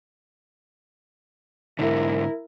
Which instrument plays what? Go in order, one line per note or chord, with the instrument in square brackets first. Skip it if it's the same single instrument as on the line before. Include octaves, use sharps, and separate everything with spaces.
[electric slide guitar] G#2 D3 [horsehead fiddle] E4 A#4